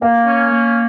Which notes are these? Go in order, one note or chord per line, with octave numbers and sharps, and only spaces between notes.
A#3 F5
C#4
A#3